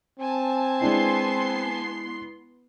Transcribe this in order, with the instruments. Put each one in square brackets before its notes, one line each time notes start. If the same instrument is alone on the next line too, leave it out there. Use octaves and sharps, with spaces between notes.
[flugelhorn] C4 [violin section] G#5 A5
[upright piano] G#3 D4 E4 [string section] B3 C6 C7